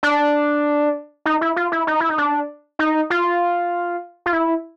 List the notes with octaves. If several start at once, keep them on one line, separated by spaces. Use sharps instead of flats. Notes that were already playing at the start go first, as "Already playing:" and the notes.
D4
D#4
E4
F4
E4
D#4
E4
D#4
D4
D#4
F4
F4
E4